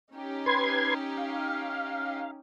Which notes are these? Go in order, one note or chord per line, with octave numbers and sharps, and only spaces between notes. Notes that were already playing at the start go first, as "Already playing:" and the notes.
C#4 D#4 G4
B4 C6 G#6
F5